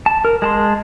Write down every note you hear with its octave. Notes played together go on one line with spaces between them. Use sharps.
A5
A#4
G#3 A5 C6